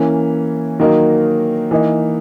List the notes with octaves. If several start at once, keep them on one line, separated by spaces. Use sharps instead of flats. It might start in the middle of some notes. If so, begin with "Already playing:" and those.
Already playing: E3 A#3 C#4
D#3 F#3 A#3 D#4 A#4
E3 A#3 D#4